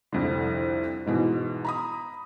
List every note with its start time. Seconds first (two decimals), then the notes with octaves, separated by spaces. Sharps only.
0.13 C2 F2 D3
1.06 G#2 B2 E3
1.65 A#5 B5 D#6